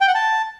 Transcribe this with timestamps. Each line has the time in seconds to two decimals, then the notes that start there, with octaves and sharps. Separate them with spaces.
0.01 G5
0.08 F#5
0.15 A5